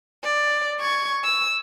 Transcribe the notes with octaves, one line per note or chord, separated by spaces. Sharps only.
D5
C#6 G#6
E6